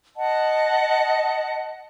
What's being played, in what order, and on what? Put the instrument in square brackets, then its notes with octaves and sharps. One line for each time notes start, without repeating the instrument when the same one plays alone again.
[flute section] D#5 F#5 A5